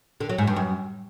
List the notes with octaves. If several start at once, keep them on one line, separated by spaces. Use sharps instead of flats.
D3
F#3
G#2
G2
F#2